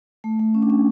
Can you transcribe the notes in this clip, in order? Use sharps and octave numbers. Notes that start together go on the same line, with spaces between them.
A3
A3
C#4
D4
C#4